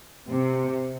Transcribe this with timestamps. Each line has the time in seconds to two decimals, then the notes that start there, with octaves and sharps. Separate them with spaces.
0.29 C3